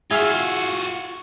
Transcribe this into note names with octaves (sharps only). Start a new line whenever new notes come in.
F4 F#4 G#4 E5 F5